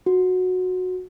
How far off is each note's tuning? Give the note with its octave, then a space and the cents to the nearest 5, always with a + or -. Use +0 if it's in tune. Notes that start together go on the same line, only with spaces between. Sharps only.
F#4 -10